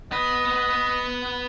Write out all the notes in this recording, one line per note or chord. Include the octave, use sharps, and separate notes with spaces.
B3 B4 D#5